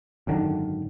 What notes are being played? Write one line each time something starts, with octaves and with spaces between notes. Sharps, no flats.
G#1 F#2 D3 D#3